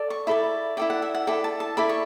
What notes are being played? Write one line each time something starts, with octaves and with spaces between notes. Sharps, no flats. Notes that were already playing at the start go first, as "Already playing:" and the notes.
Already playing: A4 D5
C#6
E4 A4 D5 B5
E4 A4 D5 G5
F#5
E5
F#5
E4 A4 D5 G5
A5
A5
E4 A4 D5 B5
C#6